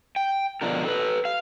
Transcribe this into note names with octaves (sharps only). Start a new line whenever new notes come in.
G5
B2 D3 F3 D4 A#4
A4 B4
F5